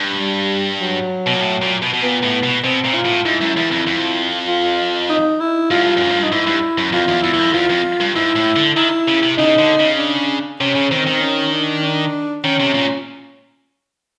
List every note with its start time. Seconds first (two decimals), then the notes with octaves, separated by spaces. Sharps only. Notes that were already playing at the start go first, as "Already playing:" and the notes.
Already playing: G2
0.19 G3
0.80 F#3
1.27 B2
1.35 A#2
1.41 A2
1.62 A#2
1.82 B2
1.94 B2
2.03 A#2 B3
2.23 A2
2.43 B2
2.64 B2 C4
2.85 A#2
2.95 F4
3.05 A2
3.25 G#2 E4
3.41 F#2
3.57 E2
3.71 F2
3.87 F2
4.48 F4
5.09 D#4
5.40 E4
5.71 G2 F4
5.81 G#2
5.86 G2
5.97 G2
6.01 F#2
6.10 G#2
6.16 G2
6.23 D#4
6.32 G#2 E4
6.46 G2
6.78 F#2
6.92 F2 F4
7.08 E2
7.23 E2 E4
7.33 E2
7.39 F2
7.54 E2 F4
7.69 F2
8.00 G2
8.15 G#2 E4
8.36 A2
8.56 D3
8.76 D#3 E4
9.08 C#3
9.23 C3
9.38 C#3 D#4
9.59 D3
9.79 C#3
9.99 D4
10.60 C3 C#4
10.75 C#3
10.91 D#3 C4
11.07 D#3
11.21 C#4
11.52 D4
11.83 D4
12.44 D#3 C#4
12.60 C3
12.74 A#2